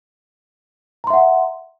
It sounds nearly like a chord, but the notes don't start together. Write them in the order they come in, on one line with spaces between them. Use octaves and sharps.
A#5 C6 E5 F#5